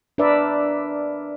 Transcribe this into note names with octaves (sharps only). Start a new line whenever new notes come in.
D4 A#4 B4 D5 E5